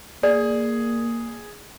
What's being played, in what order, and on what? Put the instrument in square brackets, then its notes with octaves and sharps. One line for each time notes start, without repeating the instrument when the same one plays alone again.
[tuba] A#3 [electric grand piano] G#4 [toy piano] D5